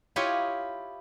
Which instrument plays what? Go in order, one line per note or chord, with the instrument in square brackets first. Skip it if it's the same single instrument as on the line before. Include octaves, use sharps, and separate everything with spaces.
[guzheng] E4 F4 G4 C#5 D#5